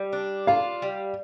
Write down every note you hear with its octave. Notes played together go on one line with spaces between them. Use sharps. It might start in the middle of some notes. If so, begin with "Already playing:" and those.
Already playing: G3
D4
F4 F5
G3